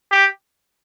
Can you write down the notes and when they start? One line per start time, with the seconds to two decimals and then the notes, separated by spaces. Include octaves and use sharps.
0.12 G4